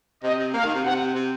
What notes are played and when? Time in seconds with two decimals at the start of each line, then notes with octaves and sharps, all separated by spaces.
0.23 C3 D#5
0.39 C3
0.54 A#3 F5
0.64 D#3
0.74 C3
0.84 C3 F#5
1.15 C3